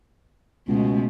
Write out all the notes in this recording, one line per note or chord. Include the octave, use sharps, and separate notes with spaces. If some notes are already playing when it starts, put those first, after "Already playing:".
C#2 B2 G#3 A3